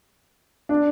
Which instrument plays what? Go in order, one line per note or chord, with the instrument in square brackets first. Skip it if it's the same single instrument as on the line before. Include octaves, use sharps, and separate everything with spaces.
[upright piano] D4